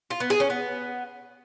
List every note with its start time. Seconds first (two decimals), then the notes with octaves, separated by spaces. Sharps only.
0.10 F4
0.20 B3
0.30 G#4
0.40 C#4
0.50 B3